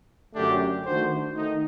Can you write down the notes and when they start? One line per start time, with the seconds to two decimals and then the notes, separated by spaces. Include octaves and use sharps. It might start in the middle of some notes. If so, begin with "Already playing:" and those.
0.35 F#2 D3 A3 D4 G4
0.84 D#3 A3 D4 F#4 C5
1.34 D#3 A3 D#4